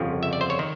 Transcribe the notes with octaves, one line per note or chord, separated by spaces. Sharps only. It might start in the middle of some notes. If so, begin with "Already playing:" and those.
Already playing: G1 F2 C#3 F3
E5
D5
C5
C#5
D#3